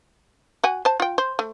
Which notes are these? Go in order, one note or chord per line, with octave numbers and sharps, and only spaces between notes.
F#4 F#5 G#5
C5 A5
F4 G5
C5
A3